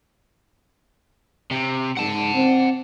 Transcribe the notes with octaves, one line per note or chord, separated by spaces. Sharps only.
C3
G#2 F#5 A5
C4